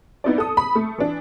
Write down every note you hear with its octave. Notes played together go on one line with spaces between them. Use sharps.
B3 D#4 E4 D5
A4 D#6
B5
A3
E3 D4